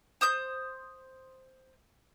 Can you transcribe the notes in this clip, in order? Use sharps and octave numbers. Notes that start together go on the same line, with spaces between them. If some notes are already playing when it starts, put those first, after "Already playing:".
C5 D#6 G6